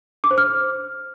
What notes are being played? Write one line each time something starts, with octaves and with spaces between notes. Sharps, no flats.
D6
C5
F6